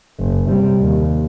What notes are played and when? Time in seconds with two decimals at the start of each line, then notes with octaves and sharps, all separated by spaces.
0.19 F#1
0.49 C3 G3
0.80 D#2